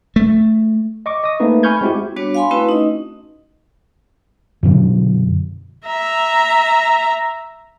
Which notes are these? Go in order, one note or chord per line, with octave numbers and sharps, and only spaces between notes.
A3
D#5 C#6 D6
D#5 D#6
A3 A#3 C4 D#4 B4
G#5 B5 C#6 F6 G6 G#6
G#3 C4 E4 F#4 G4
G3 B3 D4 F#4 C#5
F5 G5 G#5 B5 C6
A3 C4 C#4 E4 F#4 B4
D#4 D#5
F#2 B2 D3 F#3
E5 A#5